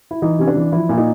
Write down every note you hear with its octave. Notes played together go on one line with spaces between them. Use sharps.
E4
E3 D#4
C3 C#4
D4
E3
F3 E4
A#2 E4
D#4